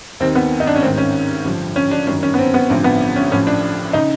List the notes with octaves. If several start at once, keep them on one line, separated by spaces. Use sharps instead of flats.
D#2 D#3 C4
B3
D#4
D4
C#4
A1 G#2 D#3 C4
C#4
A1 G2 D3 F3
C#4
D4
G1 F#2 D#3 C#4
C#4
B3
C4
B3
A1 G2 D3 F3 C4
B3
C#4
A1 A2 F3 C#4
D4
C#3 D#4